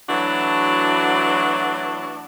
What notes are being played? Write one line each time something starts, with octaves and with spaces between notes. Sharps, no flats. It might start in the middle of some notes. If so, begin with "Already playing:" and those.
E3 F#3 A3 D4 F#4